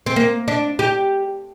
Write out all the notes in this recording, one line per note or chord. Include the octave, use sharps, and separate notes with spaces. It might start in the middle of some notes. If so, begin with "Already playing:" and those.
C4
A#3
D4
G4